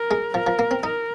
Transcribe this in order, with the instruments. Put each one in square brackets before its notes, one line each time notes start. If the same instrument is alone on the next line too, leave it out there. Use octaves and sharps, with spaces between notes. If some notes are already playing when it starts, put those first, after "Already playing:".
Already playing: [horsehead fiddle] A#4
[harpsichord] G#3
[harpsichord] F3 [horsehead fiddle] A#4
[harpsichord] F3
A#3
C4
[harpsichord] D#4 [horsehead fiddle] A#4